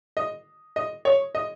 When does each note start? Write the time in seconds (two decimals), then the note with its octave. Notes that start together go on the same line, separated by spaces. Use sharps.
0.17 D#5
0.76 D#5
1.05 C#5
1.35 D#5